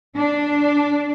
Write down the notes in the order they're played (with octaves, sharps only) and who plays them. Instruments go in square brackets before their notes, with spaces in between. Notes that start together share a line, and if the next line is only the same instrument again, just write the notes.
[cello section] D4